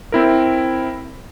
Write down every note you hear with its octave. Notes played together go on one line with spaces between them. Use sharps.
C4 E4 A#4